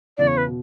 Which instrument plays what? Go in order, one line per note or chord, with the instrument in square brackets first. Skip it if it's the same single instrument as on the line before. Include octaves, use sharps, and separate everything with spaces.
[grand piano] E2 C#3 E3 [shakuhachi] D5
[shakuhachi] C#5
B4
[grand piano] B2